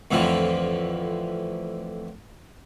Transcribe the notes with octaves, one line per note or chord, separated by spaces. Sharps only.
F2 A2 D3 E3 F3